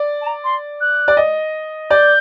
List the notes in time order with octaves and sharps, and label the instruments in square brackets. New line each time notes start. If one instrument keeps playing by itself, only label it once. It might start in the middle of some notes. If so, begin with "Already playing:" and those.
Already playing: [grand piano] D5
[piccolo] A5
A#5
C6
F#6
[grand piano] D5
D#5
[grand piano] D5 [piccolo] G6